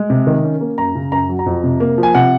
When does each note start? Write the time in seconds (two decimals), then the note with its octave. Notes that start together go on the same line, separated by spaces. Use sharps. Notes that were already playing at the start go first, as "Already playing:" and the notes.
Already playing: G#3
0.10 C3
0.27 D#3
0.44 C#4
0.61 A#3
0.78 F#2 A#5
0.95 C#3
1.12 F#2 A#5
1.29 F#3
1.39 A#5
1.46 F2
1.64 C3
1.80 A#3
1.98 F3
2.03 G#5
2.15 C3 F#5